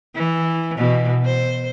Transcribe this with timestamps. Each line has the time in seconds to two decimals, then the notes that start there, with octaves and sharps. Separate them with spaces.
0.15 E3
0.77 B2 E3
1.25 C5